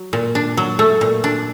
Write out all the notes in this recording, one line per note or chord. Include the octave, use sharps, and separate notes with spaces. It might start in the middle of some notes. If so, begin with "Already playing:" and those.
Already playing: F#3
A#2
D4
F#3
A3
A#2
D4